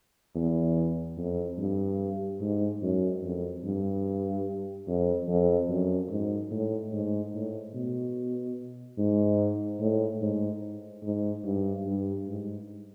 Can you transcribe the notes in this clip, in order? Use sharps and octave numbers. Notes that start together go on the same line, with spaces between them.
E2
F2
G2
G#2
F#2
F2
G2
F2
F2
F#2
G#2
A2
G#2
A2
B2
G#2
A2
G#2
G#2
G2
G2
G#2